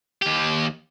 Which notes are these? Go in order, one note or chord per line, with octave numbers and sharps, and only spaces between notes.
D#2 G4